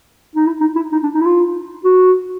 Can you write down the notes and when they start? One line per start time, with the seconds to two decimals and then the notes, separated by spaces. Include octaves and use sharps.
0.36 D#4
0.46 E4
0.61 D#4
0.76 E4
0.92 D#4
1.03 D4
1.14 D#4
1.21 E4
1.26 F4
1.84 F#4